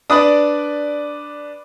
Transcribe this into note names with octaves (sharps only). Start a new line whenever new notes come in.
D4 B4 D5 D6 D#6